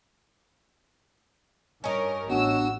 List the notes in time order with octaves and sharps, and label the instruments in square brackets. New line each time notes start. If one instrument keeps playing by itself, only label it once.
[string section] G2 A#4 [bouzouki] C#4 D#4
[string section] A1 E6 [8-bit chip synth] B3 D4 [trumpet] F#4